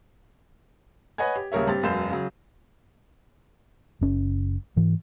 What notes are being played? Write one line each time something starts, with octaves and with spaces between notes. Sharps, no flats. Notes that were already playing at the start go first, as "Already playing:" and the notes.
B4 C#5 D#5 F#5 G#5 G#6
G4
D#1 C#3 A#4 C#5 E5
G2 C4 G4 A6
E1 F#2 B4 F5 G6 E7
C#3 F#3
F#1 C#4
G#2 E3